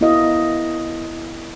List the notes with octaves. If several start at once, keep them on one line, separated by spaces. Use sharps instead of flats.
B3 E4 F#4 A#4 D#5 F5